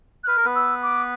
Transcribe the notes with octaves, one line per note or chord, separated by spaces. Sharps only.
F#6
B4 F6
A#4
B3 B4
E6
D6